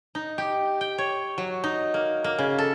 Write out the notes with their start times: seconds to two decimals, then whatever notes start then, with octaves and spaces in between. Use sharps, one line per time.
0.15 D#4
0.38 G4
0.81 G5
0.98 C#5
1.38 F#3
1.64 D#4
1.94 A#3
2.24 A#3
2.39 C#3
2.58 A4